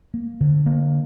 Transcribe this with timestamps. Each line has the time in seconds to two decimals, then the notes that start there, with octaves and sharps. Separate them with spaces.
0.14 A#3
0.41 D3
0.66 A#3